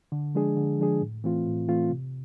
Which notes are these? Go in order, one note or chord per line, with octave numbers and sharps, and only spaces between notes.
D3
F3 G#3 D4 G#4
D3
F3 G#3 D4 G#4
A2
E3 A3 C4 F4
A2
E3 A3 C4 F4
C3